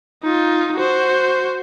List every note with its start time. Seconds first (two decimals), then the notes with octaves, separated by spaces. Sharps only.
0.23 D#4 F4
0.76 F#4 C5